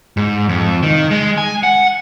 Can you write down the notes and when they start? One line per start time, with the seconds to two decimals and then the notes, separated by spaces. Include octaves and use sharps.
0.17 G#2
0.49 F2
0.83 D#3
1.11 G#3
1.38 G#5
1.63 F#5